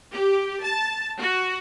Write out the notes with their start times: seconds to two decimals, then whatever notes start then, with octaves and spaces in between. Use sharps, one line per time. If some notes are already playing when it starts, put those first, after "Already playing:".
0.12 G4
0.62 A5
1.19 F#4